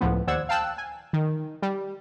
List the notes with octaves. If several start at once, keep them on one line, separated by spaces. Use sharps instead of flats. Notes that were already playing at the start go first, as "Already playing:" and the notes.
C#2 A2 F3 B3
D#2 C5 D5 F#5 E6 G#6
F5 G5 A5 E6 F#6
G#5
D#3
G3